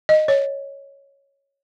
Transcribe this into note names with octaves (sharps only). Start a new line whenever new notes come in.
D#5
C#5